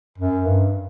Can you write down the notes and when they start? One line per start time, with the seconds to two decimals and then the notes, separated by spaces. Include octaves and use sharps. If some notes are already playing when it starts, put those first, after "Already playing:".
0.18 F#2
0.46 G2